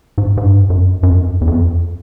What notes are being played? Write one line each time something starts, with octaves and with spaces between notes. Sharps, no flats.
G#2
G#2
G2
F#2
F#2
F2
E2
F2